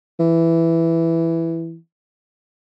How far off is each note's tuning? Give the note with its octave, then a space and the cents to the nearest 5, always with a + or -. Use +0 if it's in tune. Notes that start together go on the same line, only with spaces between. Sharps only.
E3 +5